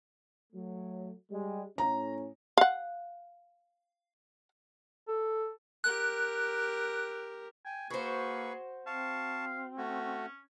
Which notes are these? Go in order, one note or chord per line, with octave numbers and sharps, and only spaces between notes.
F#3 A3
G3 G#3
A2 C#4 A#5
F5 F#5
A4
G4 A#4 F#6
G5 G#5
A#3 F#4 G#4 B4 C5 C#6
C4 F5 A5 C#6
A3 C#4 F#4